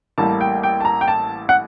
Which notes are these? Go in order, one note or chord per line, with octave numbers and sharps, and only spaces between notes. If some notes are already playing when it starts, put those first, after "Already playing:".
A1 A2 G3 A#3 A5
G5
G5
A5
A#5
G5
A5
F#5